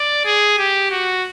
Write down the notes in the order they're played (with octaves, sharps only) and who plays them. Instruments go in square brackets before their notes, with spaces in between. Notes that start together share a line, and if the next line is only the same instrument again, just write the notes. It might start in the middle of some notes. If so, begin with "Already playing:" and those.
Already playing: [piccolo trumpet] D5
G#4
G4
F#4